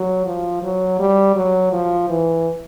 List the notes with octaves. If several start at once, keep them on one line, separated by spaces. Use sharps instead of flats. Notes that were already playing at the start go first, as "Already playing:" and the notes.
Already playing: F#3
F3
F#3
G3
F#3
F3
E3